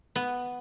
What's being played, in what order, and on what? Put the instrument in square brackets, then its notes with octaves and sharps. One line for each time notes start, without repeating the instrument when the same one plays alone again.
[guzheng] B3